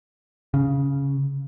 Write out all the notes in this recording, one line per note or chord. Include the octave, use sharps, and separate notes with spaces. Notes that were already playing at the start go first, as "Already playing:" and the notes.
C#3